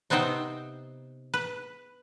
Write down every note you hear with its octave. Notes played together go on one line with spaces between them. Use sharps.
C3 B3 C4 D#4 C5 G5
B4